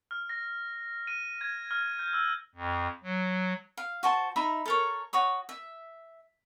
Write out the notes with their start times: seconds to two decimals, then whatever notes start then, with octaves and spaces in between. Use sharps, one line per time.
0.11 F6
0.29 A#6
1.07 D#7
1.41 G#6
1.71 F6
1.99 G6
2.13 E6
2.55 F2
3.03 F#3
3.77 F5
4.03 F#4 C5 A5
4.36 D#4 E5 A#5 B5
4.66 A4 A#4 C#5
5.13 F#4 C#5 D#6
5.49 E5